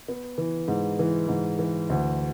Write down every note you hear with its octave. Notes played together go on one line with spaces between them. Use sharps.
B3
E3
G#2
E3
G#2
E3
D2